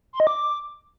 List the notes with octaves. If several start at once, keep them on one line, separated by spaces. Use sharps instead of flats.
C6
D#5
D6